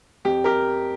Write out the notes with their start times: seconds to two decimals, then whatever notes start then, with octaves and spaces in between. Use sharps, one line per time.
0.25 F2 G4
0.44 G4 A#4